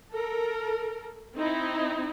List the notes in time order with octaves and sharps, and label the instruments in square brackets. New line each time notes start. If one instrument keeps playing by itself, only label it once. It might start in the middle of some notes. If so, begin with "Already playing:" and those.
[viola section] A4 A#4
C4 D#4 E4